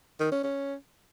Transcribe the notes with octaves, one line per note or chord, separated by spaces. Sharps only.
D#3
C#4
C#4